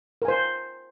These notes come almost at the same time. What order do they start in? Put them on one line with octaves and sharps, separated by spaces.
A#4 G#5 C5